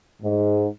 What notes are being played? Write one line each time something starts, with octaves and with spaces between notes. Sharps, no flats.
G#2